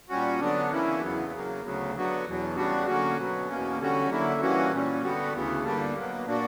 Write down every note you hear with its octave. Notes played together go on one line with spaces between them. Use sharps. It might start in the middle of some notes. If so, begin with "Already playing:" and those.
A#2 G3 C#4 F#4
D3 F#3 B3 D4
C#3 E3 A#3 C#4 E4
E2 C#3 F#3 B3
C#3 F#3 A#3
D2 C#3 F#3 B3
D3 F#3 B3 F#4
E2 B2 F#3
C#3 G3 B3 D4 F#4
D3 F#3 A#3 C#4 F#4
B2 F#3 B3
E2 B2 A#3 C#4
D3 G3 C#4 F#4
D3 F#3 A#3 E4
G2 E3 A#3 C#4 F#4
A#2 G3 C#4
G2 D3 G3 B3 F#4
D2 C#3 E3 B3
G2 D3 G3 A#3 D4
B2 F#3 A#3
A#2 A#3 D4 F#4